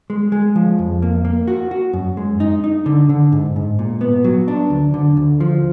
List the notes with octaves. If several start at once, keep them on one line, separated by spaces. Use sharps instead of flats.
G#3
G#3
F3
F2
A#3
A#3
F#4
F#4
F#2
G#3
D#4
D#4
D3
D3
G#2
G#2
A#2
B3
F#3
D4
D2
D3
D2
F3